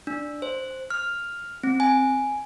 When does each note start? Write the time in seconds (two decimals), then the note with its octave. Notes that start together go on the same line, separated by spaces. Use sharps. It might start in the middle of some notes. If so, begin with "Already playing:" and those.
0.07 D4
0.42 C5
0.90 F6
1.63 C4
1.80 G#5